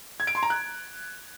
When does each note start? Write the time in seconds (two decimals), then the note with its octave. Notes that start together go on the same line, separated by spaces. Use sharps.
0.20 G#6
0.27 D7
0.35 C6
0.43 A#5
0.50 F#6